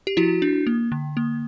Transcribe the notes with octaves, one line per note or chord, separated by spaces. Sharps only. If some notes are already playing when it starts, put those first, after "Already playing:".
G4
F3 E4 F#4
D4
A#3
D3
A#3